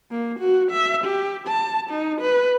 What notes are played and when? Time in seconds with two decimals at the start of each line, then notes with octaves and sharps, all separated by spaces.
0.11 A#3
0.40 F#4
0.71 E5
1.05 G4
1.48 A5
1.90 D#4
2.21 B4